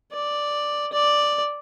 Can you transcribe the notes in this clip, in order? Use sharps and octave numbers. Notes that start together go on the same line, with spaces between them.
D5
D5